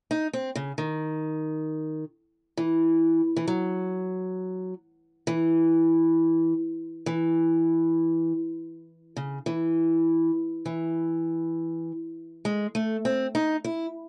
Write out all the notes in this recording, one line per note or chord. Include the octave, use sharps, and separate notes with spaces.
D#4
C4
C#3
D#3
E3
E3
F#3
E3
E3
C#3
E3
E3
G#3
A3
C4
D#4
E4